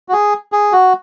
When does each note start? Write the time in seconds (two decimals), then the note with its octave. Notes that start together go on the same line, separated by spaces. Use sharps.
0.08 F#4
0.13 G#4
0.52 G#4
0.72 F#4